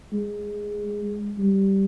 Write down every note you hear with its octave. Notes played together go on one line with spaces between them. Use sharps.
G#3
G3